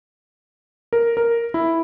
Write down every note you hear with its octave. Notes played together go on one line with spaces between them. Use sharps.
A#4
A#4
E4